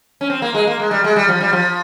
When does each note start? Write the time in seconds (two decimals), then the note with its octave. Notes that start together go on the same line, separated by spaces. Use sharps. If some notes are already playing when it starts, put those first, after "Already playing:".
0.21 C#4
0.30 C4
0.42 A#3
0.54 G#3
0.67 A#3
0.80 G#3
0.91 G3
1.04 G#3
1.16 G3
1.28 F3
1.41 G3
1.52 F3